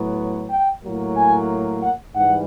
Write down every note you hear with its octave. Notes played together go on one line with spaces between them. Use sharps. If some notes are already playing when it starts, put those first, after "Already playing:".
Already playing: A2 F#3 B3
G5
A2 F#3 A#3
G#5
F#5
G#2 E3 G3 F#5